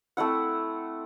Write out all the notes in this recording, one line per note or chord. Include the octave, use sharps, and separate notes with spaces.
A3 C4 E4 F#5